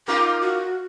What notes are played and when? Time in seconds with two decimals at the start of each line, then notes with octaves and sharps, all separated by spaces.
0.08 D#4 F4 A#4 D6
0.41 F#4